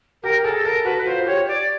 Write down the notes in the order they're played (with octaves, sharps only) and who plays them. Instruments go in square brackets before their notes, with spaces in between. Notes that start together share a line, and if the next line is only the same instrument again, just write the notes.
[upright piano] G4 [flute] A#4
[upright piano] G#4 [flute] A4
[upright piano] A4 [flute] A#4
[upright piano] F#4 [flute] B4
[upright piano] F4 [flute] C5
[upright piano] G4 [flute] C#5
[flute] D5